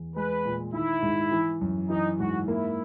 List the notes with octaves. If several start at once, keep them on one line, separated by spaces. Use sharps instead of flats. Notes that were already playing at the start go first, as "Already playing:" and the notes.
Already playing: E2
G#3 B4
A#2
D#3 E4
G#2
E3
F#2
E3 D#4
G#2 F#4
A#3 E4